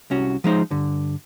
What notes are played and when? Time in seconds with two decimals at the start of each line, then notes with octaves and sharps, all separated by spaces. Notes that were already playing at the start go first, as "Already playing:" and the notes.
0.11 C2 C#4 F#4
0.44 F3 G#3 D#4 C5
0.71 G2 D3